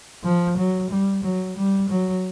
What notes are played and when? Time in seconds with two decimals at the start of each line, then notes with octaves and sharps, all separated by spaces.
0.24 F3
0.57 F#3
0.90 G3
1.23 F#3
1.56 G3
1.89 F#3